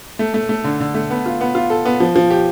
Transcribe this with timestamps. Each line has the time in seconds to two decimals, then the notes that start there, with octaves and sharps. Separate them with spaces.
0.19 A3
0.34 A3
0.49 A3
0.64 D3
0.80 D3
0.94 A3
1.10 B3
1.26 F4
1.41 B3
1.55 F4
1.70 A4
1.85 B3
2.00 F3
2.16 F3
2.30 G4